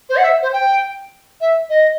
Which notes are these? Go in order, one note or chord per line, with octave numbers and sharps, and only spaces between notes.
C5
F#5
E5
C5
G5
E5
D#5